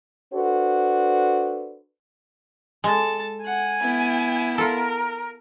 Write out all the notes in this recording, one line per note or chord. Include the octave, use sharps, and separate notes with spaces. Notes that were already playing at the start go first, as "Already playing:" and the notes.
D4 F#4 A4 B4 C5
G#3 A4 A5
F#5 G#5
B3 E4
F4 A4 A#4